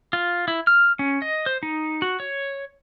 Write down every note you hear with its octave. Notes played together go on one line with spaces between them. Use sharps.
F4
E4
F6
C#4
D#5
C5
D#4
F#4
C#5